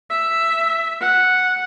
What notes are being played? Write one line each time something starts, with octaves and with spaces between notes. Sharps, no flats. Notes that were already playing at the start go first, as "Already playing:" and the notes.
E5
F#5